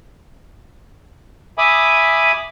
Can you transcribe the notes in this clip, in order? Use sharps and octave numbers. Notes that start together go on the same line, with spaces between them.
E5 G#5 B5 D6 D#6